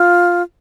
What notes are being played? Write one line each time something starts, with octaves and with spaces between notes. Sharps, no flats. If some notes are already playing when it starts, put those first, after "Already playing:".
Already playing: F4